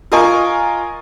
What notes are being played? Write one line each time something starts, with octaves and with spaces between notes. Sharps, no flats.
F4 A#4 D#5 G#5 C#6